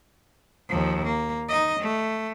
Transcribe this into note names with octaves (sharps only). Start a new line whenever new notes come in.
D#2 F3
A#3
D#4 D#5
A3